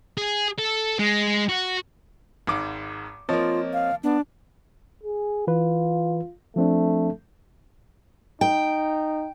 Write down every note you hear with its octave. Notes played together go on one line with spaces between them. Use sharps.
G#4
A4
G#3
F#4
G#1 G#2 D6
F3 A#3 C4 F4 C#5 D#5
F5
B3 D4
G#4
E3 F4 B4
F3 A3 C4 D4
D#4 G5